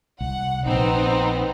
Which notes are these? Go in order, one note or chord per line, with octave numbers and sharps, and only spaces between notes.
C2 F#5
A#1 B3 C4 D#4